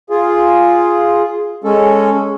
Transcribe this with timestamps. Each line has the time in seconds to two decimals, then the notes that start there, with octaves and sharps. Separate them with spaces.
0.10 F4 G#4
1.64 G#3 C#4 A4